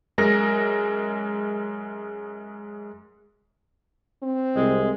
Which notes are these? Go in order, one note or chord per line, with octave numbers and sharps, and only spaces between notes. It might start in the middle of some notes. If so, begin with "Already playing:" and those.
F#2 G#3 A#4 A#6
C4
C2 G#3